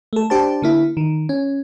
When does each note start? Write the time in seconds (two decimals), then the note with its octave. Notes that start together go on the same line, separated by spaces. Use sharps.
0.13 A3 A4
0.30 D4 G4 C5 A5
0.62 D3 A#3 E4
0.97 D#3
1.29 C#4